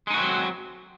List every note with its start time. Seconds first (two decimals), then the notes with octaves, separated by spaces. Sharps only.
0.07 G#3
0.11 D#4
0.14 F#4
0.17 C4
0.21 F#3